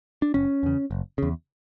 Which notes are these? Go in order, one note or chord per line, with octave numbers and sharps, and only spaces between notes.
D4
F#1 C#4
E2 C#3
F#1
E2 C#3